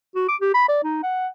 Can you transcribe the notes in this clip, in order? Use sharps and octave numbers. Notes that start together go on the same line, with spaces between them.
F#4
D6
G4
B5
D5
D#4
F#5